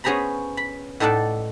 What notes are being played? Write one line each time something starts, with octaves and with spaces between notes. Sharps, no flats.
B3 C#4 G#4 C5 A#5 B5
B5
A2 D#4 A4 D5 F#5 A5